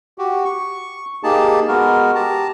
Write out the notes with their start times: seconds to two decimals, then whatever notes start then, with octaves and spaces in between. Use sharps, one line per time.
0.18 F#4 G4
0.45 C#6
1.23 A#3 D#4 G4 G#4 A5
1.68 G#3 B3 F#4 A#4
2.15 G4 A5 A#5